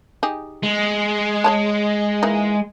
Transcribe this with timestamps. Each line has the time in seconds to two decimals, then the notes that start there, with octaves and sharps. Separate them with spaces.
0.23 D#4 G4 G#4
0.63 G#3
1.44 G#4 C#5 A5
2.23 E3 A#3 D#4